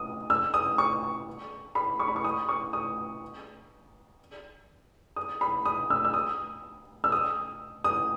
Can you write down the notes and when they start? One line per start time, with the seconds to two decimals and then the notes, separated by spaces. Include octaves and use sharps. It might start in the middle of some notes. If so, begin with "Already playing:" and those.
Already playing: D#6
0.30 E6
0.54 D#6
0.78 C#6
1.75 B5
1.99 C#6
2.08 B5
2.16 C#6
2.24 D#6
2.49 C#6
2.73 D#6
5.16 D#6
5.41 B5
5.65 D#6
5.90 E6
6.05 E6
6.14 D#6
7.04 E6
7.12 D#6
7.84 D#6